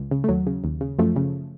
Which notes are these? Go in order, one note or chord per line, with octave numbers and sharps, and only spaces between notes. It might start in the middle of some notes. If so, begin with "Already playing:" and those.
Already playing: C#2
C#3
A3
D#2 F#3
C#3
D#2
C#3
F#2 F3 A3
C#3